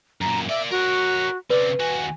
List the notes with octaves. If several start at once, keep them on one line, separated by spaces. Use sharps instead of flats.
F#2 A#2 A#5
A#3 D5 E5
F#4 A#4 C#5
C#3 C4 B4 D5
D#2 F#4 G#5